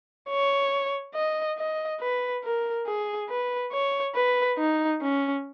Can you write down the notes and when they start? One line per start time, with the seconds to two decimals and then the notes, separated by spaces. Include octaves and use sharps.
0.30 C#5
1.15 D#5
1.58 D#5
2.01 B4
2.44 A#4
2.86 G#4
3.29 B4
3.72 C#5
4.15 B4
4.58 D#4
5.01 C#4